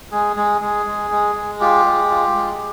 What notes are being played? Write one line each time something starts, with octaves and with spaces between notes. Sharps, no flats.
G#3 G#4
G#3 G#4
G#3 G#4
G#3
G#3
G#3
F4 G4
G#3
F4
G#3